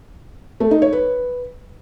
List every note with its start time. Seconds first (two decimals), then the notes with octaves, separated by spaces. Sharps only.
0.60 A3
0.71 D#4
0.82 C#5
0.93 B4